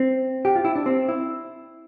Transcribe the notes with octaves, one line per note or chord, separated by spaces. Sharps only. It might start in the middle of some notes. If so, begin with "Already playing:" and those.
Already playing: C4
G4
F4
E4
D4
C4
E4